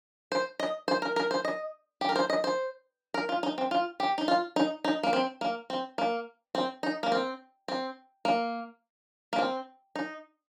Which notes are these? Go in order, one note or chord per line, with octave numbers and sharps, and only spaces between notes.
C5
D#5
C5
A#4
A#4
C5
D#5
G4
A#4
C5
D#5
C5
A#4
F4
D#4
C4
F4
G4
D#4
F4
D#4
D#4
A#3
C4
A#3
C4
A#3
C4
D#4
A#3
C4
C4
A#3
A#3
C4
D#4